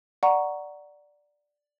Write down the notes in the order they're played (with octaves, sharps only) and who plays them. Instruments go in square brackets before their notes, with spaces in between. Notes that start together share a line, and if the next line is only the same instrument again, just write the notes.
[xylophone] D5 F#5 A#5 C#6